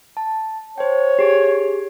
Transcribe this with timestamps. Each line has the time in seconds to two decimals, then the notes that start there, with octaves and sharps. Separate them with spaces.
0.17 A5
0.78 C5 C#5 G5
1.19 G4 G#4